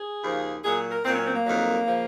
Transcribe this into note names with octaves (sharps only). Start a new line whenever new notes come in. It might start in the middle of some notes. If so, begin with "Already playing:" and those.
Already playing: G#4
D#2 C#3 F3
A#2 F#3 G#4
A#4
A#2 F#3 C4
C#4
C4
A#3
F2 D#3 F#3
C#3 F3